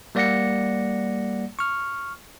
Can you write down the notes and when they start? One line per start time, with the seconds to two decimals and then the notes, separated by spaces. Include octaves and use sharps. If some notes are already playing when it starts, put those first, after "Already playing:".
0.15 G3 A#3 D5 F#5 A#6 C#7
1.59 C#6 F6